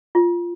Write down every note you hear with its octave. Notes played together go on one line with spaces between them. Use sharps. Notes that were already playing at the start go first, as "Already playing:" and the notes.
F4